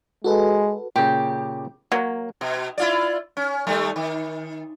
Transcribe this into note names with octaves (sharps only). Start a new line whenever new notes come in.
G#3 F#4 A4 B4
A#2 C#3 G4
F#3 A#3
B2
E4 F4 D5
C#4
D#3 G3 A3
D#3